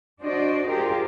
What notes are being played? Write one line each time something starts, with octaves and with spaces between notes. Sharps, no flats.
D4 F#4 C5 D5 D#5
F4 G4 G#4 A#4 C5